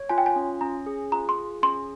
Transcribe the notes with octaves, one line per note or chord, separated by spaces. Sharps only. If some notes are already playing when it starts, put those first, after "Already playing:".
Already playing: C#5
F4 G#5
G5
G#5
C#4
C#4 A#5
G#4
F4 A#5
C6
G#4
C#4 C6